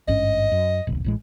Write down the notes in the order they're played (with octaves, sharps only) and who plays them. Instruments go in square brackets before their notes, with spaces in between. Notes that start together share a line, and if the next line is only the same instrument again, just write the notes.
[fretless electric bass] G#1 G2 C#4 [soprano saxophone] D#5
[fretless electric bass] F#2
D1 B1
A1 A2 G#3